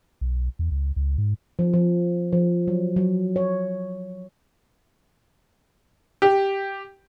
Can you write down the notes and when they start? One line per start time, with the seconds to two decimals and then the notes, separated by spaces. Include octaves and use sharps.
0.21 B1
0.59 E2
0.71 C#2
0.96 C#2
1.18 G#2
1.59 F3
1.73 F3
2.33 F3
2.68 F#3
2.96 F#3
3.36 C#5
6.22 G4